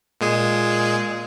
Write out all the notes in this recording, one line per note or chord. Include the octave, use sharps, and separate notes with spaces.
A#2 G#3 G#4